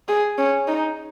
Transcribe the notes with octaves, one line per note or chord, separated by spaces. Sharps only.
G#4
C#4
D#4